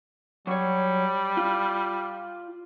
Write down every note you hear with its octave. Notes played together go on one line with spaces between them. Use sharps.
F#3 G3 C#5
F4